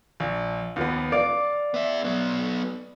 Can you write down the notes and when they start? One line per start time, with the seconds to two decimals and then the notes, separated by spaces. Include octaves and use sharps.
0.20 A#1
0.76 D#2 F3 B3
1.12 D5 F5
1.74 B3 E5
2.04 F#3 B3